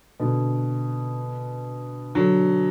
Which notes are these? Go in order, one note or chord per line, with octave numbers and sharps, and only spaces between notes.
B2 D3
D3 F#3